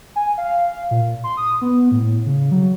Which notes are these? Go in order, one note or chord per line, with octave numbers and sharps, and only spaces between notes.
G#5
F5
A#2
C6
D#6
B3
A2
C#3
F#3